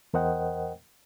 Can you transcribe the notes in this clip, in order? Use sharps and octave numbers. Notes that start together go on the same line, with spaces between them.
E2 A#4 C5 D#5 F#5 G5